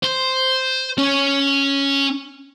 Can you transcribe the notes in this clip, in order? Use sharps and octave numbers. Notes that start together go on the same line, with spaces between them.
C5
C#4